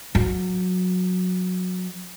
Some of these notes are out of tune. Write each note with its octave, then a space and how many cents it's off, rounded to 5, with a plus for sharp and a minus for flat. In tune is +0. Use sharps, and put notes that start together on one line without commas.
F#3 -20